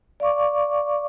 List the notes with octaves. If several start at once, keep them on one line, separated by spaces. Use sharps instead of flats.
D5 F5 C#6 D6